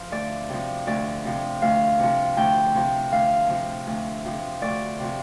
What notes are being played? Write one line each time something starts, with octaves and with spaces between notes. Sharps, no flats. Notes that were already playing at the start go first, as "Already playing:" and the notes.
Already playing: F3 F5
D2 D5
C3 F3
D2 D5
C3 F3
D2 F5
C3 F3
D2 G5
C3 F3
D2 F5
C3 F3
D2
C3 F3
D2 D5
C3 F3